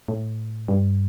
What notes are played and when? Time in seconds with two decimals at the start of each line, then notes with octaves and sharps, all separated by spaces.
0.08 A2
0.68 G2